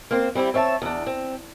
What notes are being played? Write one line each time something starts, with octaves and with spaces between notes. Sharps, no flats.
A#3 C4 C5
G3 C4 E4 G4
C4 C#5 E5 A5
E2 D4
C4